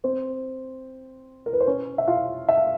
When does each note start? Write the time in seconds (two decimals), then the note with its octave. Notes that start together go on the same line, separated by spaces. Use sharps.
0.04 C4 C5
1.46 A#4
1.53 B4
1.60 C5
1.67 C#4 C#5
1.98 E5
2.07 F4 F5
2.49 E5
2.57 F5